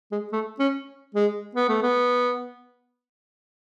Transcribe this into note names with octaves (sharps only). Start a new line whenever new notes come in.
G#3
A3
C#4
G#3
B3
A3
B3